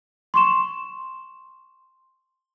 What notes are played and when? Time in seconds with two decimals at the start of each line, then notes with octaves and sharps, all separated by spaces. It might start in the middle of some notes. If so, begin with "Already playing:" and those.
0.34 C6 C#6 E7